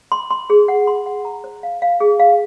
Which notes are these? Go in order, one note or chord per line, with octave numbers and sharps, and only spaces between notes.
C6
C6
G#4
F#5
C6
F#5
A#5
C5
F5
F5
G#4
F5